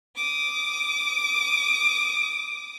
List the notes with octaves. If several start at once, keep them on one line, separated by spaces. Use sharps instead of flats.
D6 D#6